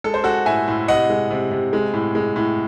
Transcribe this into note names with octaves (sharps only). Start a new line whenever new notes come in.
G#3 A4
C5
G#3 F#4 A4
A2 E5 G#5
A2
C3 D#5 F#5
G#3
C3
C3
G#3
A2
G#3
A2